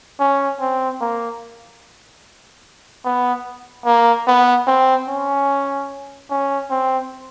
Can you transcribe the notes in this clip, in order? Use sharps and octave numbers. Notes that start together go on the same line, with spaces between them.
C#4
C4
A#3
B3
A#3
B3
C4
C#4
C#4
C4